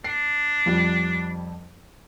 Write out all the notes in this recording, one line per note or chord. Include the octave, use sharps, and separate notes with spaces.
D4 C7
F2 F3 G3